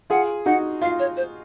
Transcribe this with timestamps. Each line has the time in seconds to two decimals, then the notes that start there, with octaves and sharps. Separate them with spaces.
0.10 F4 G#4 F#5
0.45 D#4 F#4 F#5
0.82 F4 F5
0.99 C#5
1.17 C5